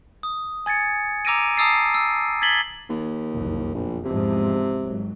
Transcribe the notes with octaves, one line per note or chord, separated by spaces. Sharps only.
D#6
G#5 G#6 A6 C#7
A#5 D6 E6 A#6 D7 D#7
A5 A#5 D#6 E6 A6 C7
E6
G#6 A6 B6 F#7 G7
D#2
F#1 C2 F2
A#1 F2 B2
E2 G#2 C3 F3
G#1 F#3